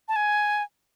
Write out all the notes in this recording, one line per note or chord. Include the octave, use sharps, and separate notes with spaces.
A5
G#5